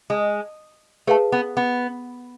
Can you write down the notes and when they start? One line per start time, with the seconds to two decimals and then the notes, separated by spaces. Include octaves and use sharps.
0.10 G#3
1.07 A3 G#4 B4 F5 A5
1.32 B3
1.57 B3